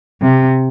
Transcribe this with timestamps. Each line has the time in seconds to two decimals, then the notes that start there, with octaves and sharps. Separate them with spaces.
0.22 C3